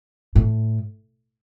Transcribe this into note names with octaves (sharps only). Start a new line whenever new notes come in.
A2